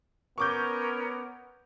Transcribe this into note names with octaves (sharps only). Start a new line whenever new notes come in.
B3 C#4 A#4 C#6 D6 G6